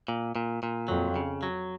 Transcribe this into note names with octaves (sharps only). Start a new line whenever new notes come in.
A#2
A#2
A#2
F2 F#3
C#3
F#3